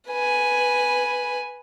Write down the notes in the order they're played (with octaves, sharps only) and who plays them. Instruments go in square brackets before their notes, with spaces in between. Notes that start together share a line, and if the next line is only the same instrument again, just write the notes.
[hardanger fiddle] B4 G#5